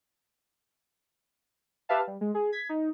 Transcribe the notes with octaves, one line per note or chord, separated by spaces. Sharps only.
G4 B4 E5 F5 A5
G3
G#3
G#4
G#6 B6
D#4